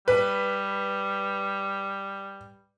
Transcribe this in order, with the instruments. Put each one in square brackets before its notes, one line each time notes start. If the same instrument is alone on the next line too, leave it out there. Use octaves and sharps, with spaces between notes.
[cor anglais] G3 [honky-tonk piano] B4